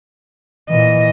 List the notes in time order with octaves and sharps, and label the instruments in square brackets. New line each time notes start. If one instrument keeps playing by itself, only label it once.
[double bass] A#2 E3 [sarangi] D#5